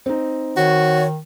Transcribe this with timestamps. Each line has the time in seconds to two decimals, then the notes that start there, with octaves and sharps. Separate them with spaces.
0.06 C4 D#4
0.57 D#3 F#4 C#5